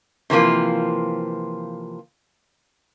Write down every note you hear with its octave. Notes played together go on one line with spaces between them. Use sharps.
C3 E3 F3 A#3 F4